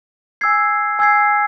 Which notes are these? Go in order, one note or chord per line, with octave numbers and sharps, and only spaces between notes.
G#5 E6 G#6 C7
G#5 E6 G#6 C7